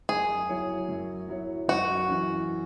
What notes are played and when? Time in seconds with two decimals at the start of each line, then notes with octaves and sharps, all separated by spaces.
0.09 F#2 G#4
0.49 F#3 E4 C#5
0.89 F#2
1.29 F#3 E4 C#5
1.68 F#2 F#4
2.09 E3 C#4